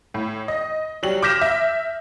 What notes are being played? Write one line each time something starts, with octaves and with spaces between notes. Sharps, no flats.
A2
D#5
F#3 G3 F#7
D6 F6 G6 A#6 B6 E7
E5